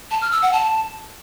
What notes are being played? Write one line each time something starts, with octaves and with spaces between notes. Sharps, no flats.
A5
F6
E6
F#5
A5